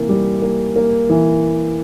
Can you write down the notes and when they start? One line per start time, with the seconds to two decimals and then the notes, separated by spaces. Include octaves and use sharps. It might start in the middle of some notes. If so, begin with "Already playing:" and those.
Already playing: C3 E3 A#3
0.09 G3
0.42 A#3
0.76 A#3
1.10 E3